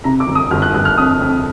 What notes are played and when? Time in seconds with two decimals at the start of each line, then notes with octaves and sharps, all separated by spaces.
0.04 C3 A#5
0.20 D6
0.27 G1
0.35 D#6
0.51 G1 F6
0.62 F#6
0.74 G1 F#6
0.85 F6
0.97 F2 D#6
1.21 F2